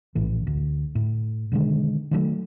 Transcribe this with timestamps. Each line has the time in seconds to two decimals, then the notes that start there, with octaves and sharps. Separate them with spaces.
0.15 A#1 A2 E3
0.47 D2
0.95 A2
1.52 B2 D3 D#3 G#3
2.11 D#3 F#3 G3 A3